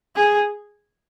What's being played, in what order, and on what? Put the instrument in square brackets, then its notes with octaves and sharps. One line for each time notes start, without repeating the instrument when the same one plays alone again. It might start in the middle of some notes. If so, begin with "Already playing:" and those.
[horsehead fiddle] G#4